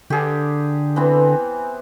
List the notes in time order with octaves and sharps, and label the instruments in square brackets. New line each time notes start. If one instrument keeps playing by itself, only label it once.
[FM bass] D3 [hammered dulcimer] G4 G#4
[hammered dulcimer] E3 B3 C4